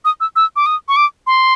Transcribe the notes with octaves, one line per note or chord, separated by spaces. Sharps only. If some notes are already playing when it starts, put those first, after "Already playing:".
D#6
E6
E6
D6
D#6
C#6
D6
C6